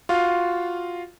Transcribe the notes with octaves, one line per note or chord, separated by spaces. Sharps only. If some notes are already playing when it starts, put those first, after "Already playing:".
F4 F#4 F5